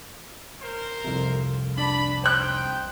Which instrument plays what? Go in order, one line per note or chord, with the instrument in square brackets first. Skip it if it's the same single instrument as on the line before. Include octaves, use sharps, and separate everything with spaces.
[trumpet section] A#4 C5 C6
[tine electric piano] C2 F2 C3
[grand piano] D4 [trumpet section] A5 B5
[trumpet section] D#4 G5 [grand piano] C5 F#6